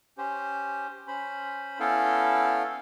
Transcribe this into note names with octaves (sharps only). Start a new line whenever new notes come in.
C#4 G4 C5
C#4 C5 B5
B3 C#4 E4 A4 F5 G5